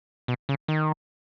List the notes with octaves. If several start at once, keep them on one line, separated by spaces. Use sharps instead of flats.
B2
C#3
D#3